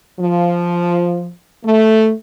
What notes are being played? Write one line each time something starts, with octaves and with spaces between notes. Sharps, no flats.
F3
A3